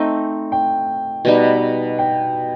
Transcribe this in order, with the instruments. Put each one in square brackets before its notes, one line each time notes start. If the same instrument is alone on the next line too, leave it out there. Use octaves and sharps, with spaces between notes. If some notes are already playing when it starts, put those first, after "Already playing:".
Already playing: [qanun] A3 C4 D#4
[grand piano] G5
[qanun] B2 G3 D#4
[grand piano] G5